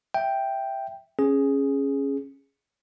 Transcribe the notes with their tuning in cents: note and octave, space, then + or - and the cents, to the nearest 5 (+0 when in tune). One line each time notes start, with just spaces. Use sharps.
E5 +0 G5 +0
C#4 -10 G#4 +0